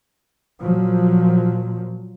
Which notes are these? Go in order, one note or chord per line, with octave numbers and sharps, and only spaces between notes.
A#2 F3 F#3